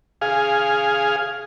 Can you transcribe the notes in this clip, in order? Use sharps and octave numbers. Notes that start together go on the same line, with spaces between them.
G#4 F5